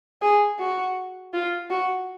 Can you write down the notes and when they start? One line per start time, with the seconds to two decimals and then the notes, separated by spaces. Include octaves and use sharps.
0.22 G#4
0.59 F#4
1.34 F4
1.71 F#4